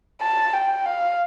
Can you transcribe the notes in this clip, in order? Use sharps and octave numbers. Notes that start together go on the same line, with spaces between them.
A5
G5
F5